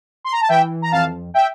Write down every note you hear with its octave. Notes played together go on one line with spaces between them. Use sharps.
C6
A#5
A5
E3 E5 G5
A#5
F2 F5 A5
E5 G5